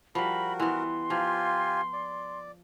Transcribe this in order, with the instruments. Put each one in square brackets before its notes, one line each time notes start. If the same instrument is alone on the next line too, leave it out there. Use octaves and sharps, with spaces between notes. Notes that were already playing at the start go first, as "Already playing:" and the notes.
[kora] F3 G3 [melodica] F#4 A#4 [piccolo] B5
[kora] E3 B3 [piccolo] C6
[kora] F3 [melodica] F4 G4 G#5
[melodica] D5